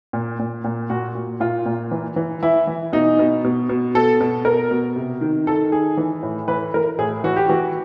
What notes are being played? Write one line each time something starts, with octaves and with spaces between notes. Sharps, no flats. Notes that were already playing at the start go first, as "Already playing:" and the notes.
A#2
A#2
A#2
A#2 F#4
A#2
A#2 F4
A#2
E3
E3
E3 E4
E3
B2 D#4
B2
B2
B2
B2 A4
B2
B2 A#4
B2
C3
D#3
D#3 A4
D#3 G#4
E3
A2
E3 B4
E3 A#4
A2 G#4
E3 F#4
G4
E3 F#4